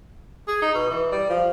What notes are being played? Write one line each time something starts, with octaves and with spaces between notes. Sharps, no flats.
G#4
D#4
B2
E3
G3
F3